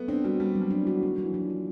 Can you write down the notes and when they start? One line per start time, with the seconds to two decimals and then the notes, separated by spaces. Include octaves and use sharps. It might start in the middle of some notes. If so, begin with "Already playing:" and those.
Already playing: F#3 A3 B3
0.08 C4 D4
0.24 G3 F#4
0.40 G3 A#3
0.55 F#3
0.61 G3
0.71 D4
0.82 E3 F#4
0.95 D3
1.02 D#3 A#3
1.18 F#3
1.24 E3
1.34 D4
1.44 F3
1.50 F#4